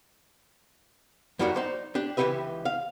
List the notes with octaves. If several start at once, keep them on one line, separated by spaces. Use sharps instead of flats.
F#2 F#3 G3 A#3 F4 F#4
D#4 C5 D5
D4 G4
C#2 E3 F3 G4 B4 E5
F5